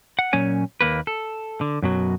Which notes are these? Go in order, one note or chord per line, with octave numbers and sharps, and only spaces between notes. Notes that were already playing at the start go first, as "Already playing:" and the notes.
F#5
A#2 F#3 C#4 C#5 G#5
D#2 A#3 B4
A4
D3
F#2 B2 F#3